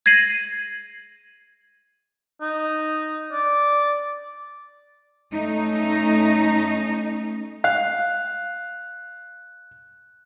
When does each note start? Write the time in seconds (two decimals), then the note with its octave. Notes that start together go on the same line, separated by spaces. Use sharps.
0.06 G#6 A#6 C7 D#7 F#7
2.42 D#4
3.32 D5
5.33 A3 C#4 D#4
7.64 F5 F#6